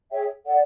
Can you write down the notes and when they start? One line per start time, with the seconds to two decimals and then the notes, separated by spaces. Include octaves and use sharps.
0.11 G#4 C#5 E5 G5
0.45 A4 D5 F#5